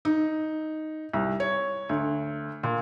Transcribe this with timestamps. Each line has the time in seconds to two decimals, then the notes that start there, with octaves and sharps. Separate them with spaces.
0.05 D#4
1.13 C2
1.40 C#5
1.89 D2
2.63 A#2